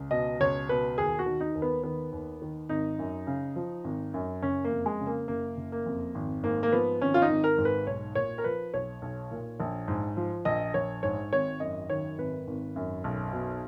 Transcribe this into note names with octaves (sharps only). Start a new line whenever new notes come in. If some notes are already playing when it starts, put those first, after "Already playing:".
Already playing: C#2
B2 D#5
C#2 C#5
B2 B4
D#2 G#4
F#4
D#3
D#4
D#2
B3
D#3 B3
D#2
D#3
G#1 D#4
F#2
C#3
F3
G#1
F#2
F#1 C#4
A#3
F2
G#3
C#3
A#3
F#1 A#3
F#1
A#3
F2
G#1
G#2 A#3
A#3
F3 B3
G#1 C#4
F4
D#4
G#1
A#4
G#2
B4
B1 C#5
A#2 C#5
A#4
F3 B4
B1 C#5
B1
A#2
A#1
G#2
F3
A#1 D#5
A#1 C#5
G#2 C#5
G#1 C#5
F#2 D#5
D#3 C#5
G#1 B4
G#1
F#2
B1
B2